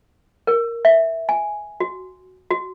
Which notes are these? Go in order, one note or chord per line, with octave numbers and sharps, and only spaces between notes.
A#4
E5
G#5
F#4
F#4